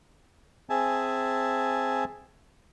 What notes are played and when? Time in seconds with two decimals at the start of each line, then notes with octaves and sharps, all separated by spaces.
0.70 C4 G#4 E5 G#5 A5